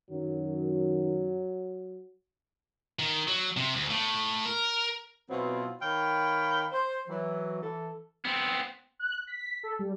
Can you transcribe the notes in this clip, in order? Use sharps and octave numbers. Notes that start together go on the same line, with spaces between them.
F#2 D#3 F#3
D#3
F#3
C3
D2
A2
A#4
B2 F#3 B3 C4 E4 F4
D#3 C#5 F5 G5 B5
C5
E3 F#3
E3 A4
B3 C4
F#6
B6
A4
G3